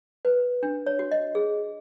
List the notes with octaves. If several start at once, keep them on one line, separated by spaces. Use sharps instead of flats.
B4
D4
C#5
F#4
D#5
G#4